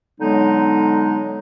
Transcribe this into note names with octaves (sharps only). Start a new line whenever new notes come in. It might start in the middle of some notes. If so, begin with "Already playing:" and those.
D3 F#3 G#3 B3 D#4